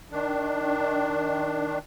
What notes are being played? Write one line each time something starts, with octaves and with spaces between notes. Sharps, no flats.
D#3 D4